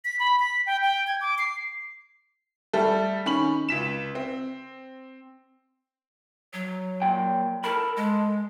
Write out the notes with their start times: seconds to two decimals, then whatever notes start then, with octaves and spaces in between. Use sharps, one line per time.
0.05 B6
0.19 B5
0.39 B6
0.66 G5
0.83 G5
1.07 G#6
1.21 D6
1.38 C7
2.73 G3 A3 A4
3.26 D#3 C#4 B5 F#7
3.69 C#2 B6 E7
4.15 C4
6.53 F#3
7.02 A#2 G5
7.64 A4 A#4 A5 B5
7.97 G#3